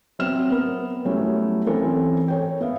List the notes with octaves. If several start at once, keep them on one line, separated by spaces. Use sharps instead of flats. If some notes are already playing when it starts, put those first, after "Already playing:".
F#3 B3 C4 E5 F6 E7
B3 A#4
F#3 G3 A3 B3 C#4 E4
E3 C4 C#4 A4 A#4 C5
A4 C#5 G5
B3 E5 F5